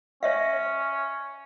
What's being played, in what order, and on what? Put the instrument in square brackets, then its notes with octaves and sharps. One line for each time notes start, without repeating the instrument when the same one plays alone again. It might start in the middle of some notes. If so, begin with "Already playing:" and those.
[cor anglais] C#4 [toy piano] C#5 E5 F5